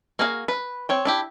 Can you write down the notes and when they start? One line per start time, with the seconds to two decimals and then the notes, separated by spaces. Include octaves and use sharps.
0.19 A#3 F#4 G#4 F5
0.48 B4
0.89 C4 C#5 G5
1.05 D4 E4 G4